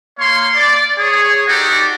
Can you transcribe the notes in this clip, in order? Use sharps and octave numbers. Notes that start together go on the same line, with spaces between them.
A#3 C#5 F5 C6
D5
G#4 C#5
D#4 F#4 G4 A4 D5